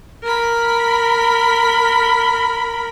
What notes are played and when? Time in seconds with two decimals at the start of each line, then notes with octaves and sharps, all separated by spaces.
0.23 A#4 B5